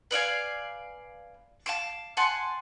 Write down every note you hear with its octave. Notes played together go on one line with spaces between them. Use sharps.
B4 D5 F5 G#5
F5 A5 D6
F#5 G#5 A5 C6